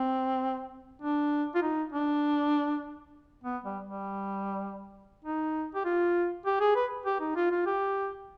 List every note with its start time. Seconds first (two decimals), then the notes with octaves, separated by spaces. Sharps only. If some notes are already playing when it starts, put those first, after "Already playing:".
Already playing: C4
1.02 D4
1.55 F4
1.62 D#4
1.92 D4
3.44 B3
3.64 G3
3.84 G3
5.24 D#4
5.75 G4
5.85 F4
6.46 G4
6.60 G#4
6.75 B4
7.06 G4
7.21 D#4
7.36 F4
7.51 F4
7.66 G4